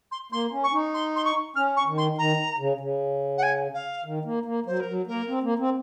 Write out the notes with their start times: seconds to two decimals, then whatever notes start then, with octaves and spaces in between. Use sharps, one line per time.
0.11 C6
0.32 A#3 C6
0.52 C#4
0.63 C#6
0.73 D#4
0.94 C6
1.16 C6
1.25 C#6
1.55 C#4 F6
1.76 C#6
1.86 D#3
1.97 C6
2.18 D#3 A#5
2.59 C#3
2.80 C#3
3.38 F#5
3.43 G#5
3.74 F5
4.05 D#3
4.25 A#3
4.45 A#3
4.66 F#3 C5
4.80 A#4
4.88 F#3
5.07 A#3 A#4
5.28 C4
5.43 A#3
5.59 C4